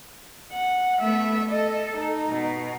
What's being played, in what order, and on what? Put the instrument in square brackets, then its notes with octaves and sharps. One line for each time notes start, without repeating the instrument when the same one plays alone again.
[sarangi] F#5
[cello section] A3 B3 [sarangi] E5
[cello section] A4 [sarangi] D#5
[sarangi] D#4
[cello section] B2